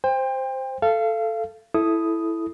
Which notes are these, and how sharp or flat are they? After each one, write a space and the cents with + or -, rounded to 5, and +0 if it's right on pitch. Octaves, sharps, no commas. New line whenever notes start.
C5 +0 G5 +30
A4 +0 F5 -30
E4 +0 A4 -10 D#6 +0